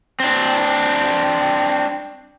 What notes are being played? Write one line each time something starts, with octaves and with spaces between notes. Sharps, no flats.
C4 D4